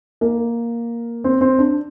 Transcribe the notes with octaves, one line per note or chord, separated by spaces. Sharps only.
A#3
C4
C4
D4